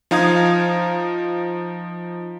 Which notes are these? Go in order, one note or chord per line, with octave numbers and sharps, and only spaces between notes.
F3 D#4 F5 A#5 D#6 G#6